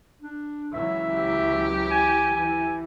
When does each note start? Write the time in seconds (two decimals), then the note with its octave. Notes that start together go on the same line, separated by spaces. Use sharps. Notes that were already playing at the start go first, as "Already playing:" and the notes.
0.22 D4
0.74 C#2 E3 F#3 E5
1.15 G4
1.91 G#5
2.36 E3 G#5